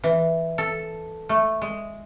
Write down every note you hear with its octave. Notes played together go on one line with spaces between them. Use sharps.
E3
A4
A3
G#3